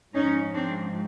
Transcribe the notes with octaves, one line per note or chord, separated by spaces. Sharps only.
G#2 F3 C#4 D#4
C4 D4